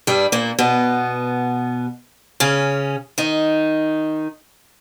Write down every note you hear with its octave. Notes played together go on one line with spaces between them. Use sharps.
G2 G3
A#2 A#3
B2 B3
C#3 C#4
D#3 D#4